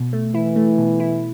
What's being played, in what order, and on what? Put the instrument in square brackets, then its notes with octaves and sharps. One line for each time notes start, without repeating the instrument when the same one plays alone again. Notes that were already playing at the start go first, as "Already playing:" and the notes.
Already playing: [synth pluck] B2
A3
[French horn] E3 [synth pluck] E4
[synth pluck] A3
B2
E4